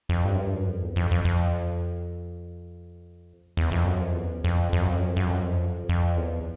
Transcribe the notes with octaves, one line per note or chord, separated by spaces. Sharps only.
F2
G2
F#2
G2
F#2
F2
E2
F2
F2
F2
E2
F2
F#2
F2
E2
F2
F2
F#2
F2
F#2
F2
F#2
F2
F#2
F2
F2
E2